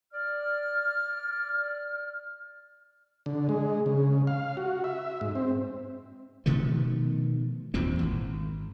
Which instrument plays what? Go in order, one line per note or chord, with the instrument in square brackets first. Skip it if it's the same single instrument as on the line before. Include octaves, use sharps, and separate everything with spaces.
[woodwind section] D5 F6
[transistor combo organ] D3
G#3
C#3
F5
F#4
E5
G#2
C4
[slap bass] B2 D#3 F3 A3
E2 A#2 E3 C4
G#1